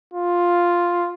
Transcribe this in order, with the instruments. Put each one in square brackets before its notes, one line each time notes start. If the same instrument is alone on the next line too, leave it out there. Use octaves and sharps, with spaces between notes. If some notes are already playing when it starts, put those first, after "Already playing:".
[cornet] F4